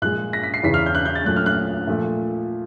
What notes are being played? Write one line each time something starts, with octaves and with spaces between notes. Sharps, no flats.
A#2 F3 G#3 F#6
A#6
B6
C7
E2 C#3 E3 B6
F6
G6
F#6
G6
A6
A#2 F#3 A3 F#6
F6
F#6
A#2 F3 A3